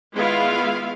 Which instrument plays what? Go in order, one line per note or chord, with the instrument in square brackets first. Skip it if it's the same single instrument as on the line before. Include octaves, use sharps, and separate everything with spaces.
[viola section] D#3 G#3 B3 E4 F4 F5